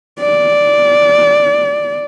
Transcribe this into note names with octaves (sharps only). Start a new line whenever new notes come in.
D5